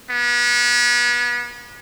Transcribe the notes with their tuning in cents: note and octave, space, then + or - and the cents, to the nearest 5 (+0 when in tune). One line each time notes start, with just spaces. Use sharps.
B3 -35